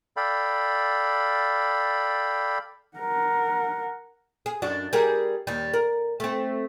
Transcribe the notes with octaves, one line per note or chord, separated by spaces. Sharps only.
A4 D5 F5 G5 B5
A#4 F#5
G#4
F#2 D4 F#4
G3 G#4 A#4
D#2 G3
A#4
A3 C4